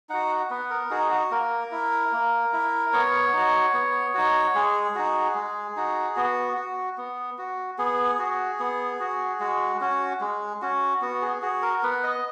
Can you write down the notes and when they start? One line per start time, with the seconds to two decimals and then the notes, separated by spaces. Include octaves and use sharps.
0.09 D#4 F#4 F#5
0.50 B3 B4
0.70 A#4
0.90 D#4 F#4 G#4
1.11 F#4
1.31 A#3 A#4
1.72 E4
2.12 A#3
2.53 E4
2.93 B3 C#5
3.33 D#4 F#4
3.74 B3
4.14 D#4 F#4
4.55 G#3 G#4
4.95 D#4 F#4
5.35 G#3
5.76 D#4 F#4
6.16 B3 F#4
6.57 F#4
6.98 B3
7.38 F#4
7.78 B3 G#4
8.19 F#4
8.60 B3
9.00 F#4
9.40 G#3 F#4
9.81 C#4 F#4
10.21 G#3
10.62 C#4 F#4
11.02 B3 F#4
11.22 G#4
11.42 F#4 G#4
11.62 A#4
11.83 B3 B4
12.04 D#5